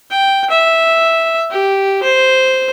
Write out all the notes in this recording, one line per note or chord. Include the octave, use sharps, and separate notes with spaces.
G5
E5
G4
C5